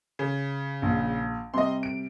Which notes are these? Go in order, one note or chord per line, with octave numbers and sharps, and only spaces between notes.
C#3
A#1
C3 G3 D#5 C6
D7